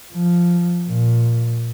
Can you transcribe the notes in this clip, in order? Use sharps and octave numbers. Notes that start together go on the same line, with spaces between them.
F3
A#2